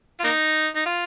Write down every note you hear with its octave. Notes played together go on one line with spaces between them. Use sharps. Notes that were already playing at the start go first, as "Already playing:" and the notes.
F4
A#3 D#4
D#4
F4